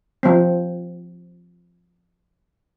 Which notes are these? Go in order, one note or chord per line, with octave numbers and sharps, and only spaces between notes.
F3 C4